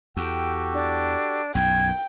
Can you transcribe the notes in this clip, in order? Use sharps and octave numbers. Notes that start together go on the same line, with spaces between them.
E2 F#4 G4 A4 G5
D4
B1 F#2 G5 G#6